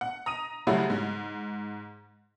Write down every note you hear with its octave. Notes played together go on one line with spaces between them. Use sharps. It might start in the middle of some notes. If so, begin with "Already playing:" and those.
F#5
A#5 D#6 D#7
F#2 C#3 G3 A3 E4 F#4
G#2